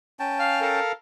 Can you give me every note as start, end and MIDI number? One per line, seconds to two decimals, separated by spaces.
0.20 0.80 61
0.20 0.80 79
0.20 0.80 81
0.39 0.61 77
0.39 0.61 89
0.61 0.92 69
0.61 0.92 70
0.61 0.92 77